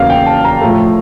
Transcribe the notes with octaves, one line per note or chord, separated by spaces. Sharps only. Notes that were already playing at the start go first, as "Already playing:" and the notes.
Already playing: E2 C#3 F#3 A#3 C#4 F5
G5
A5
A#5
A2 F3 A3